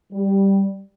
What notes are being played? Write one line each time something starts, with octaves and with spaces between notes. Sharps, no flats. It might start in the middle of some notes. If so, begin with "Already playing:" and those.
G3